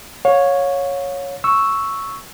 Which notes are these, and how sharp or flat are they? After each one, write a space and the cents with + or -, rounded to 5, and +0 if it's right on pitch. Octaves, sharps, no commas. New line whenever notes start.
C#5 +0 F5 +35
C#6 +0 E6 +0